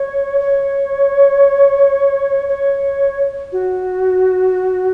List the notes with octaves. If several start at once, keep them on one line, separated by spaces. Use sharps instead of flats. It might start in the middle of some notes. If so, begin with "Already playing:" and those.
Already playing: C#5
C#5
C#5
F#4